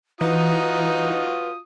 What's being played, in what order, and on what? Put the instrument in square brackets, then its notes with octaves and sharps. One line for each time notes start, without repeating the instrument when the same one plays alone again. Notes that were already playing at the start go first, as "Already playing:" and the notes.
[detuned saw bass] E3 [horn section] D#4 [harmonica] F4 F#4 D#6 [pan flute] B4